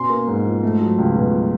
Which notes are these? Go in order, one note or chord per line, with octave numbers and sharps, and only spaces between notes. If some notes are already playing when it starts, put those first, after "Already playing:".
Already playing: B2 C#4 C6
A#3
G#2
F3
A3
F#3
C#2
B2